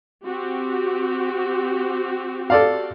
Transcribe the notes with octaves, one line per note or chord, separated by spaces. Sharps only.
C4 F#4 G4
A4 D5 F5